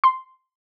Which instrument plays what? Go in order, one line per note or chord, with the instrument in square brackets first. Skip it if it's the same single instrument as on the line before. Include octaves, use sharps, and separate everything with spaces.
[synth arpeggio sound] C6